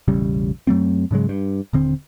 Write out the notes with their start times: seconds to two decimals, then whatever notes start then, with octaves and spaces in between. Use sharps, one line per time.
0.08 E1 A1 C#3 G3
0.67 F#2 F#3 A3 C4
1.11 G#2 C#3 F#3 G#3
1.29 G2
1.73 D#1 D3 C4